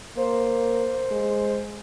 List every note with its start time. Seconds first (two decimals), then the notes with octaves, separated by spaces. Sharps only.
0.17 A#3 C5
1.11 G#3